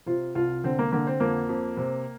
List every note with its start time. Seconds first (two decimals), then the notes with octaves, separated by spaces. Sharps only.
0.06 C3 F4
0.35 C2 F4
0.64 D3 C4
0.79 A#3
0.92 D3 A#3
1.07 C4
1.20 F2 A#3
1.49 F2
1.77 C3